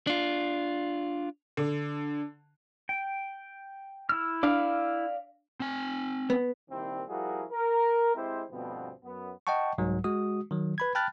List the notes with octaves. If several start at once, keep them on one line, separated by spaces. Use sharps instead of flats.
D4 F4
D3
G5
E4 E6 F6
D4 D5 F5
C4 G#5
B3
C2 A#2 D#3 C4 E4 G4
F3 G3 E4 F#4 G#4 A#4
A#4
G#3 C4 E4 G4 C5
D2 G2 B2 F3 B3 C4
F#2 B3
D#5 F#5 G5 A5 C#6
C2 G#2 F#3
G#3 F#4 D#6
D#3 F#3
B4 B5 G#6
G5 A5 B5 F6 F#6 A6